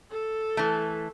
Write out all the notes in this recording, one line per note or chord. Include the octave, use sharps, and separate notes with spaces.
A4
E3 A3